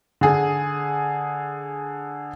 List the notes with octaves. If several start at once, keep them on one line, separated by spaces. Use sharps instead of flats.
D3 G#4